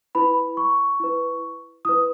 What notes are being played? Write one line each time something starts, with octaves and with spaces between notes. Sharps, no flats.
E4 B4 B5
C#6
E4 B4
E4 B4 D#6